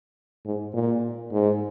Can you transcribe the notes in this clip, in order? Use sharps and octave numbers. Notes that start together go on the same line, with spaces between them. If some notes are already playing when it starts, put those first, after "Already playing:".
G#2
A#2
G#2